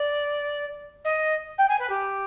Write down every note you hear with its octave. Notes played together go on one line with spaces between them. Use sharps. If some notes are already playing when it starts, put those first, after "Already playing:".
Already playing: D5
D#5
G5
G#5
B4
G4